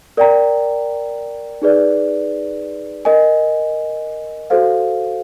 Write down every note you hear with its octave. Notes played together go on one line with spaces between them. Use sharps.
A#4 D5 G5 A#5
D#4 G#4 B4 D5
A#4 D#5 G#5
F#4 A4 C5 F5